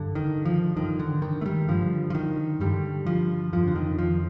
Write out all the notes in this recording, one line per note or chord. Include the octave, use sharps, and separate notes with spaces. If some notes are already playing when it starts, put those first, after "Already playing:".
Already playing: G2 D3
D#3
F3
G2 D3 D#3
D3
D#3
A3
G3
G2 D3 F3
F3
D#3
G2 D3 G3
F3
F2 D3 F3
D3
D#3
F3